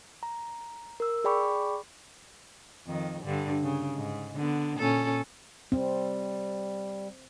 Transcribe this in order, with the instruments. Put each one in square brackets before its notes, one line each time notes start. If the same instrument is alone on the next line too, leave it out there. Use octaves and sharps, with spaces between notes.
[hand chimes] A#5
A#4 E6
G#4 D5 G5 B5 C#6 D6
[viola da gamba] F2 D#3
G2 D3
C#3
G#2
D3 B3
A#2 C#4 A4
[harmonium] G3 [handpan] C4